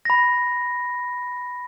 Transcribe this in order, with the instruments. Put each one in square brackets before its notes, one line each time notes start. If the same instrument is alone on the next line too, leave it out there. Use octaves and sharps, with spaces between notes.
[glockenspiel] B5 A#6